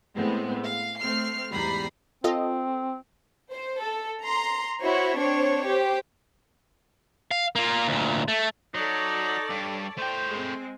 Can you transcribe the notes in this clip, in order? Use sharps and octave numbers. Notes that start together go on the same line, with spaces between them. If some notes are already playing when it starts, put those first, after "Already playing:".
A2 G#3 B3 C4
F5
A3 C4 F6 C7
E2 G#2 G3 A#5 B5 C7
C4 F4 A4 D#5
C5
A4
A#5 C6
E4 F#4 C5 C#5
C4 D4 C5 C#5
G4 C5
F5
A#3 F4
D2 A#2
A3
F#3 D#4 A4 C#5 D5
G2
A3 C5 G5
G#3 C4